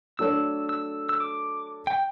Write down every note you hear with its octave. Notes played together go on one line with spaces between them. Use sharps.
F#3 A3 D4 A4 C#5 E6
E6
E6
D6
G5